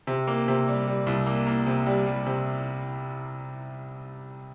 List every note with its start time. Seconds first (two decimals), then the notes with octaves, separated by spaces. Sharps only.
0.07 C3
0.27 A#3
0.48 C3
0.68 G3
0.87 G3
1.07 C2
1.26 A#3
1.47 A#3
1.67 C3
1.86 G3
2.06 G3
2.26 C3